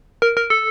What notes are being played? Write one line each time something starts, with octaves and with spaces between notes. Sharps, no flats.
A#4
A#4
A4